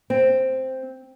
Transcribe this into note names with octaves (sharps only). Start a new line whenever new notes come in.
C4